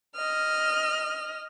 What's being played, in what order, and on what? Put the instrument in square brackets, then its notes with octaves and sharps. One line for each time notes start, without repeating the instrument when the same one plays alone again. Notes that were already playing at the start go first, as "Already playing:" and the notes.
[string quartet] D#5 F6